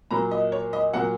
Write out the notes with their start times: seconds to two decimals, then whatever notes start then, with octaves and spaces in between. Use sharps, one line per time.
0.11 A#2 F#3 A#5
0.31 D#5
0.52 C#5
0.73 D#5
0.94 A#2 F#3 F#5